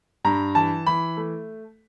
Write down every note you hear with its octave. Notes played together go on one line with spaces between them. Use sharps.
G2 A#5
E3 A5
E3 B5
A3